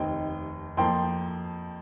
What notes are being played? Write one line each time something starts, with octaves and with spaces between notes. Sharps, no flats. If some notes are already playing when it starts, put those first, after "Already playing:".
Already playing: F1 D#2 D#3 C4 D#5 G5
F2 F3 A#3 G5 C6